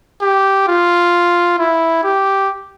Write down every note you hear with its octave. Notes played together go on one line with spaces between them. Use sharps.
G4
F4
E4
G4